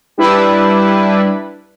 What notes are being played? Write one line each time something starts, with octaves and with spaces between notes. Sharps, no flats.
G3 D4 E4 B4